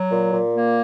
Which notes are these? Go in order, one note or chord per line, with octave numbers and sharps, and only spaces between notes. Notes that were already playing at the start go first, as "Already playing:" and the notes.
Already playing: F#3
A#2
A#2
A#3